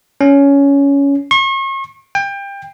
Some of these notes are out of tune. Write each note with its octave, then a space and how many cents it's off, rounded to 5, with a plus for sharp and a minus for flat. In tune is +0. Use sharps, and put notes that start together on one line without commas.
C#4 +15
C#6 -40
G5 +25